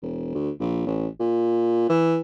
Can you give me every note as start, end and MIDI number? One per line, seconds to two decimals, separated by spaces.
0.02 0.30 28
0.35 0.51 38
0.60 0.82 34
0.86 1.08 33
1.20 1.88 46
1.89 2.21 52